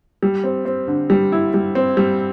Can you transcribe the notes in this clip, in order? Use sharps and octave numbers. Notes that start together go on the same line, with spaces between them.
G3
C4
C4
D3
G3
E4
G3
C4
G3